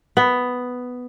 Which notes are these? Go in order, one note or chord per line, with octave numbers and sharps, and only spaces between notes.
B3